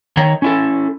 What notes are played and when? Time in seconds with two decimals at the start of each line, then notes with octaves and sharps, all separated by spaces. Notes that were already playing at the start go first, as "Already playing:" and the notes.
0.17 D#3 C#5 A#5
0.42 C#4 E4 A4